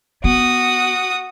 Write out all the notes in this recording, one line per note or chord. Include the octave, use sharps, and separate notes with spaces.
B3 F#4 D#6